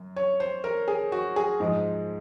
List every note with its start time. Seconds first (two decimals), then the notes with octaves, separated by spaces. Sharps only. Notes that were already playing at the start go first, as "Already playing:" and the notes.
Already playing: F#2
0.16 C#5
0.40 C5
0.64 A#4
0.88 G#4
1.12 F#4
1.36 G#4
1.60 G#2 F3 G#3